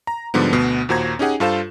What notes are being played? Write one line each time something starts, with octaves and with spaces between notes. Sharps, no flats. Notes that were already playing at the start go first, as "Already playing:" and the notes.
A#5
G#2 D3 F3 G3 B3
D2 B2 B3 C7
D#2 A#2 F#4 C5 A#5 G#6
C#4 D#4 G4 G#4 F#5 G#5
G2 F4 A4 C5 F5 E7